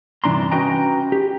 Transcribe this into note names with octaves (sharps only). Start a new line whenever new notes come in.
G2 C3 E3 D4 A#5 C6
C#4 F#4 B4 D#5 G5 A#5
G4